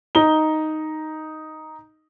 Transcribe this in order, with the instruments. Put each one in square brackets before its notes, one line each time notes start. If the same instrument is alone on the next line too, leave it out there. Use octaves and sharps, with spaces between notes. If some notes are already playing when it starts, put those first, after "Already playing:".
[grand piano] D#4 G7